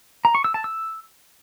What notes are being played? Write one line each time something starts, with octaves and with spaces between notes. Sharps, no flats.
A#5
C#6
E6
A5
E6